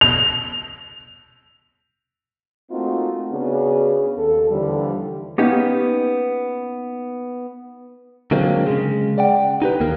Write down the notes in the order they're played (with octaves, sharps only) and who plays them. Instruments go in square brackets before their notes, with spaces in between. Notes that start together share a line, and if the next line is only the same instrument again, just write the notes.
[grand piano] F7
[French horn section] A3 A#3 C4 D#4 F4 F#4
C#3 B3 C#4 D4 F#4 G#4
D#2 A4
D#2 D3 E3 F3 G3
[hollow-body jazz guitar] A#3 B3 C#4 D#4 G4
[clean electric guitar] D3 F#3 G#3 A#3 C4
C#3 G#3
D5 F#5 G5
D#4 G4 B4
D#2 A#3 A#4